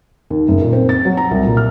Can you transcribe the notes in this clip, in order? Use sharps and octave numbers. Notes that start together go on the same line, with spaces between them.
D#2
F#1
A#2
C4
A6
F#3
A#5
C2
A#2
F6